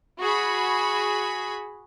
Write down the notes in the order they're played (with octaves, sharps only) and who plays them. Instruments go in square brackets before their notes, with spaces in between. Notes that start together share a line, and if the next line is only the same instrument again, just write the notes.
[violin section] F#4 G#4 B5